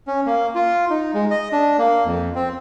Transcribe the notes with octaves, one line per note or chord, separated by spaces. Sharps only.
C#4
A#3
F4
D#4
G#3
D#5
D4
A#3
F2
C4